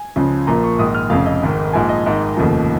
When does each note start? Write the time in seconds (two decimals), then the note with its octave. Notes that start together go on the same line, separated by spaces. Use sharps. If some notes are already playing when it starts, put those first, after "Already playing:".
Already playing: G#5
0.16 C#2 C#3 F3
0.47 A#1 A#2 F3 A#5
0.64 C#6
0.79 A#1 G#2 D#3 D#6
0.95 F6
1.10 F1 F2 C#3 F5
1.26 D#5
1.43 G#1 G#2 D#3
1.73 A#1 G#2 F3 G#5
1.89 D#5
2.06 G#1 G#2 D#3
2.37 F1 D#2 C#3 F3